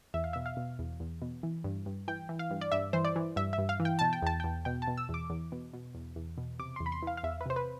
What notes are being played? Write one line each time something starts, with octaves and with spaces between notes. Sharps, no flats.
E2 E5
F5
B2 E5
F5
B2
E2
E2
B2
E3
G2
G2
E3 G5
E3
F5
G2
D5
G2 E5
E3 C5
D5
E3
G2 E5
E5
G2
F5
E3
G5
B2 A5
G5
E2 A5
G5
E2
B2 G5
A5
B2
E6
E2
D6
E2
B2
B2
E2
E2
B2
C3 D6
C6
E2
B5
C6
E3 F5
F5
E2 E5
B4
C3 C5
B4